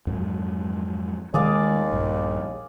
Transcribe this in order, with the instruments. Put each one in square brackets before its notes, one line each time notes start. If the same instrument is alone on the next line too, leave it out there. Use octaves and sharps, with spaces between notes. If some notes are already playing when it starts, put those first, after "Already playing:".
[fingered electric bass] F2 G#2 F#3
[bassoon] D#2 [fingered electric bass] D#3 G#3 A3 [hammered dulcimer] G#4 D5 F5
[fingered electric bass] A#1 G2